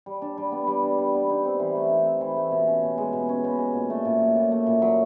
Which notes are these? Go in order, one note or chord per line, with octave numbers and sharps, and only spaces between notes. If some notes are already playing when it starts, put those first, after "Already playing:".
G3
D4
G3
B3
G3
D4
G3
B3
D#4
C4
E3
A3
D#4
C4
E3
A3
B2
C#4
B2
G#3
B2
C#4
B2
G#3
A#2
A3
A#2
F#3
A#2
A3
A#2
F#3